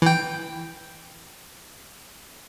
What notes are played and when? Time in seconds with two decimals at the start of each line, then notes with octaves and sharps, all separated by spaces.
0.02 E3 G5